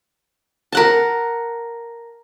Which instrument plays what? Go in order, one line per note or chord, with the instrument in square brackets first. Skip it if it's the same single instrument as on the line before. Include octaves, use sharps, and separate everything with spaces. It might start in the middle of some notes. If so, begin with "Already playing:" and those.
[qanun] A#4 F#5 A5